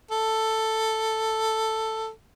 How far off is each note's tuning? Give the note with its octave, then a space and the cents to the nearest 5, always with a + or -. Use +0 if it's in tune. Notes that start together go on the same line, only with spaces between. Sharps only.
A4 +5